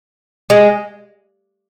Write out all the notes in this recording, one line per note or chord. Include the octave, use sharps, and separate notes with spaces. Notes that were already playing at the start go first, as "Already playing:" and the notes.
G#3